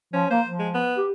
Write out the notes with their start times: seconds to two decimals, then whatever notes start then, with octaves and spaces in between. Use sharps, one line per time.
0.14 F3 C#4
0.31 A#3 C5
0.46 F3
0.59 G#3
0.74 B3
0.97 G4